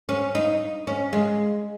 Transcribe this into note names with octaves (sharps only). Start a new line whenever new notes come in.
C#4
D#4
C#4
G#3